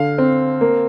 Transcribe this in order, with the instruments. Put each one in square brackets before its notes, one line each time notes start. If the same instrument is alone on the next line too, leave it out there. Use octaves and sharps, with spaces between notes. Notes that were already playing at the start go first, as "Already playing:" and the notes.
Already playing: [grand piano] D3 [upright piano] F5
[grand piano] C4
A#3